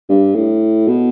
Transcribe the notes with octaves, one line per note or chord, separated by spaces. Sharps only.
G2
A2
B2